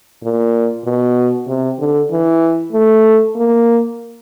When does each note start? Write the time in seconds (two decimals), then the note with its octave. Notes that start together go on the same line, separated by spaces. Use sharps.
0.23 A#2
0.86 B2
1.48 C3
1.79 D3
2.11 E3
2.73 A3
3.36 A#3